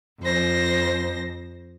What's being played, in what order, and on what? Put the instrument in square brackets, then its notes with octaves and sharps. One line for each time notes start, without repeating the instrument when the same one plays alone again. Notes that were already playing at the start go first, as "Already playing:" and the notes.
[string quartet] F2 C5 A#6